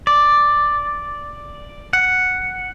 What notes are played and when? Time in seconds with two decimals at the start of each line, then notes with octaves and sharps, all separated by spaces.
0.07 D5
1.93 F#5